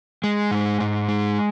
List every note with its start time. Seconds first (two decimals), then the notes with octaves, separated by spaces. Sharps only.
0.24 G#3
0.51 G#2
0.80 G#2
1.08 G#3